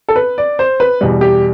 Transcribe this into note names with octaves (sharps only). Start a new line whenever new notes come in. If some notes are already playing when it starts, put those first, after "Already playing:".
A4
B4
D5
C5
B4
E2 B2 G3
G4